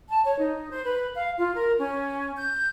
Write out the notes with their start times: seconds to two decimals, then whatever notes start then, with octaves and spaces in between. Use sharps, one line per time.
0.09 A5
0.24 C#5
0.39 D#4
0.71 C5
0.85 B4
1.15 F5
1.38 F4
1.55 A#4
1.79 C#4
2.37 G6